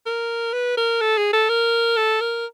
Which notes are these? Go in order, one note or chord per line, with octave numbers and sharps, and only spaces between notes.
A#4
B4
A#4
A4
G#4
A4
A#4
A4
A#4